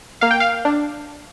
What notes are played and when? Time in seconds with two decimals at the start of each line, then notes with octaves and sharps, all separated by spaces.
0.21 A#3 F5
0.31 G5
0.40 F5
0.65 D4